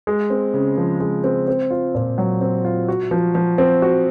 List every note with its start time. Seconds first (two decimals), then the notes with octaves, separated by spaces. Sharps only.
0.07 G#3
0.30 C4
0.54 C#3
0.77 F3
1.00 G#3
1.24 C4
1.48 C4
1.70 F4
1.95 A#2
2.18 F#3
2.41 C4
2.65 F4
2.88 F#4
3.11 F3
3.35 F3
3.58 C4
3.82 F#4